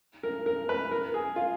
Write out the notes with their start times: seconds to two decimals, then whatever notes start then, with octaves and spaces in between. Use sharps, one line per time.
0.23 A#4
0.46 A#4
0.69 B4
0.91 A#4
1.14 G#4
1.36 F4